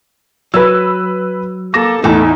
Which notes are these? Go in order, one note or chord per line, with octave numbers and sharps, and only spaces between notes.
F#3 B4 E6
A#3 A4 D6 A#6 E7
A1 E2 A3 D#4 E4